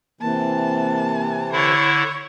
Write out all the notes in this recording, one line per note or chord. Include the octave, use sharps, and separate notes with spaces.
C3 E3 A#3 A5
D3 E4 C#5